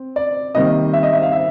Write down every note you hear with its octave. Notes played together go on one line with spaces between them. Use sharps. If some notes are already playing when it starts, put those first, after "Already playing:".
Already playing: C4
D5
C3 D#3 G3 A#3 D#5
E5
D#5
E5
F5
E5